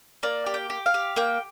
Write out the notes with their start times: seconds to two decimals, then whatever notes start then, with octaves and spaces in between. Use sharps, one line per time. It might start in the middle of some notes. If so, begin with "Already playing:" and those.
0.23 A#3 D5
0.46 G4
0.54 G5
0.70 G4
0.86 F5
0.94 G4
1.16 A#3 G5